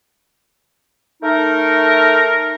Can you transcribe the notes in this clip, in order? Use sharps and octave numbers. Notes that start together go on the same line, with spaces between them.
A3 D#4 A#4